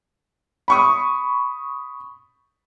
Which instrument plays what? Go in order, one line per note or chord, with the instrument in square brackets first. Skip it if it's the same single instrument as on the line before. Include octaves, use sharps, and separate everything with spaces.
[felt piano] B5 C#6 D#6